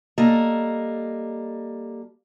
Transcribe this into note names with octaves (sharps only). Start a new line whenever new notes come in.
G3 A#3 A4 D#5